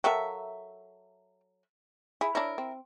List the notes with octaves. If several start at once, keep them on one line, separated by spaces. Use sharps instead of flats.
F#3 A4 A#4 E5 F5 G5
E4 G#4
D4 E4 A#4 C#5
C4